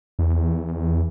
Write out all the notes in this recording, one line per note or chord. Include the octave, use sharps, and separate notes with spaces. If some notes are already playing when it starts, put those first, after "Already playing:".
E2